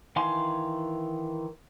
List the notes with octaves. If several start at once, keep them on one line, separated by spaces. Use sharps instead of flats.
D#3 E3 F5 G#5 C6